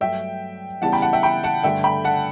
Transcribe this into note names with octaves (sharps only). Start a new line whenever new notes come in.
G2 F#3 A3 E5 G5
C#3 E3 G3 B3 F#5 A5
G5 B5
F#5 A5
E5 G5
G5 B5
F#5 A5
G2 D3 A3 E5 G5
G5 B5
F#5 A5